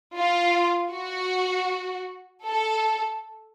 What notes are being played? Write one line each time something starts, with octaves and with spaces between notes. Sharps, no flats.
F4
F#4
A4